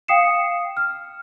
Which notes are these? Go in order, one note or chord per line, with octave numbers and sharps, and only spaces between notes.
F5 G5 D#6 C7 C#7 E7
F6